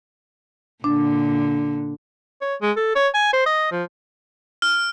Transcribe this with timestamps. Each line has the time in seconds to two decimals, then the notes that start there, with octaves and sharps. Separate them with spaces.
0.84 A#2 D3 D4
2.41 C#5
2.62 G#3
2.77 A4
2.95 C#5
3.14 G#5
3.33 C5
3.46 D#5
3.71 F3
4.62 F6